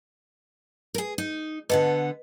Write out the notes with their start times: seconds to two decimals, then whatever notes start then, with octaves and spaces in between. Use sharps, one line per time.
0.94 G#4 A#4
1.18 D#4
1.70 D3 B3 A4 B4 D#5